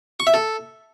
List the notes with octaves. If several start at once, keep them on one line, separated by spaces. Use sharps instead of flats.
C#6
E5
A4